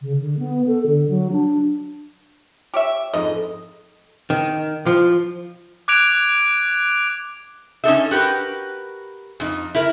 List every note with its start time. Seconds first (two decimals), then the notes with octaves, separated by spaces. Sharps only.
0.01 C#3
0.20 D3
0.39 B3
0.67 A4
0.86 D3
1.09 F#3
1.32 D4
2.74 G4 C#5 E5
3.14 F2 G#2 B4 D#5
4.30 D#3
4.86 F3
5.88 D6 F#6 G#6 D7 F7
7.84 C#4 D#4 A4 E5
8.11 F#4 G4 A#4 B4
9.40 F2 D#4
9.75 E4 A#4